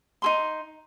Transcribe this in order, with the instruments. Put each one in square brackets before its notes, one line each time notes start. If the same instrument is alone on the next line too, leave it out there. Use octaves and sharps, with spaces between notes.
[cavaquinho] D#4 G#4 C6